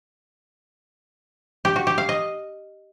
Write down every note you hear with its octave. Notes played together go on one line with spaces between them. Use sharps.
G4
F#4
G4
F5
D#5